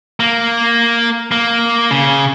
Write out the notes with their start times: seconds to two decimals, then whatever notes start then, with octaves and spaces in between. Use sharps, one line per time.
0.20 A#3
1.32 A#3
1.91 C#3